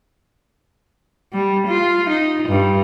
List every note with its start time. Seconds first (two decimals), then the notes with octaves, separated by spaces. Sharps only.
1.33 G3
1.68 F4
2.09 D#4
2.49 G2